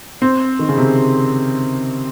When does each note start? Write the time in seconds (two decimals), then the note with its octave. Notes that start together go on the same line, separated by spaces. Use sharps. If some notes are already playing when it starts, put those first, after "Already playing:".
0.22 C4
0.59 D#3
0.69 C#3
0.78 C3